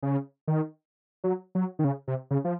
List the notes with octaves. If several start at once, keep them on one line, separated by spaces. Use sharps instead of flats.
C#3
D#3
F#3
F#3
D#3
C#3
C3
C#3
F3